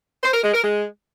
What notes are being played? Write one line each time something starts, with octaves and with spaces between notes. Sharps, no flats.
C5
A#4
G#3
A#4
G#3